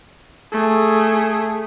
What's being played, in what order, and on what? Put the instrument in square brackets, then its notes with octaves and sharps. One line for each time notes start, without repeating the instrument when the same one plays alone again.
[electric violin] A3 G#4